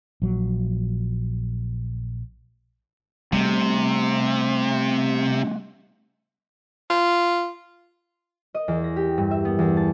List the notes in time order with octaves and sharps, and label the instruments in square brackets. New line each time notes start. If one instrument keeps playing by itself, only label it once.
[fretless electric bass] A#1 F#3
[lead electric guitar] C3 [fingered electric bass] G3 A3
[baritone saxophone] F4
[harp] D#5
E2
A#6
G4
G2
E5
B3
E2
A5